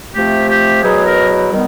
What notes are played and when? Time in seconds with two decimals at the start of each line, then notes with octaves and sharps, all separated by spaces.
0.14 C3 F3 A3 G4
0.48 G4
0.82 E2 B2 F#3 G#4
1.06 A#4
1.51 D#3 G3 B3